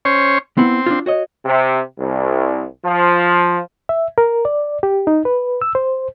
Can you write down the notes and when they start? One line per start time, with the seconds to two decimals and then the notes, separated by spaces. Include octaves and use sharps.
0.05 C#4 C5 C#5
0.57 B3 C4 E4 F#5
0.86 D4 F4
1.06 F#4 C#5 D#5
1.45 C3
1.99 C2
2.85 F3
3.89 E5
4.18 A#4
4.45 D5
4.83 G4
5.07 D#4
5.25 B4
5.62 E6
5.75 C5